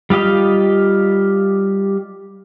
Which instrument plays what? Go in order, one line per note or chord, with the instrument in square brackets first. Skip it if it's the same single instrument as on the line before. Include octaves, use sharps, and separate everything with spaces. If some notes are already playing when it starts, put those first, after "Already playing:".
[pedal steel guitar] G3 F4 G4 D#5 F5